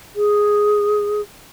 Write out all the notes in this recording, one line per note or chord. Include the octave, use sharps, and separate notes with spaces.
G#4